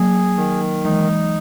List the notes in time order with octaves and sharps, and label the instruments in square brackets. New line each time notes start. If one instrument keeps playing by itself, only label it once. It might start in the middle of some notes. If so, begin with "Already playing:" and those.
Already playing: [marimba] F#3 A#3 [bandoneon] G#4
[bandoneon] D#3
[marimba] E3 G#3 [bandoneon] D#4